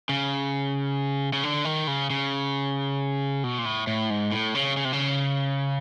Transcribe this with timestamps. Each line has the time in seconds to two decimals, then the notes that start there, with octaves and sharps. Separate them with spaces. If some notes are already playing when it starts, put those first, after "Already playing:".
0.09 C#3
1.33 C#3
1.43 D3
1.65 D#3
1.87 C#3
2.10 C#3
3.44 B2
3.58 A#2
3.66 A2
3.87 A2
4.10 G#2
4.32 A2
4.55 C#3
4.77 C#3
4.85 C3
4.93 C#3